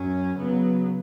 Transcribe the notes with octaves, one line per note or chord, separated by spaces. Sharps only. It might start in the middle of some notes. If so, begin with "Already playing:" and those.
Already playing: F#2 F#3 C#4
C#3 F#3 B3